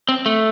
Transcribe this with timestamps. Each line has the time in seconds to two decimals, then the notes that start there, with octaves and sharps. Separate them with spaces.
0.09 C4
0.26 A3